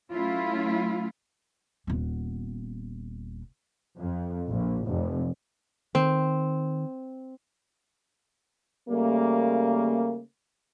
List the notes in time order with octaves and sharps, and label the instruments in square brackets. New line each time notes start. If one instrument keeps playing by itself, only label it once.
[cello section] F#3 A3 C#4 E4 F4
[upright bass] D#1 B3
[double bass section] F2
A#1
F1
[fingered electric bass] D#3 [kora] C4
[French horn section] C#3 G3 A3 A#3